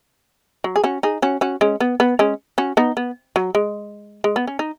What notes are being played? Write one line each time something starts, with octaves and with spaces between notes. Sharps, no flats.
F#3
G#4
C#4 F#4
D#4 G#4
C#4 F#4
C#4 F#4
G#3 C#4
B3
B3
G#3 C#4
C#4 F#4
B3 D#4
B3
F#3
G#3
G#3
B3
C#4
D#4